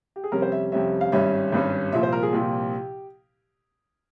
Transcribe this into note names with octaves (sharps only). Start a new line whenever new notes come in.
G4
G#4
F2 C3 G3 C#4 A#4
C5
E5
F2 C3 G3 C#4 E5
F5
G#1 G2 G3 C#4 E5
G#1 G2 G3 C#4
C2 A#2 F3 E5
C5
A#4
G#4
C2 A#2 F3 G4